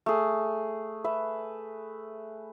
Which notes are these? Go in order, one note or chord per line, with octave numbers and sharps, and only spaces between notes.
A3 G#4
B4 E5